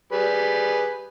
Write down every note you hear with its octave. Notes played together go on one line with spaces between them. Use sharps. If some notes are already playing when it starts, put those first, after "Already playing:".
G3 G#4 B4